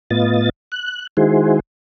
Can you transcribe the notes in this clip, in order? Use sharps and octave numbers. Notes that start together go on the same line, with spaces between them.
A2 B3 F4 D#5 A6
F#6
D#3 G#3 E4 F#4 G#4 C5